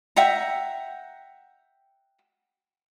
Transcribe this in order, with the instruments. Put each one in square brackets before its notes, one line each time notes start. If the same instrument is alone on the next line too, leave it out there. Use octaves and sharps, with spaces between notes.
[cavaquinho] E5 F#5 G5 A#5